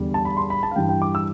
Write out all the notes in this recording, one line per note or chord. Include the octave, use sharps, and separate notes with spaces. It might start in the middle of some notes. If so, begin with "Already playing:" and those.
Already playing: E2 D3 G3
A5
B5
C6
B5
A5
F5
G2 E3 G3 G5
G5
D6
E6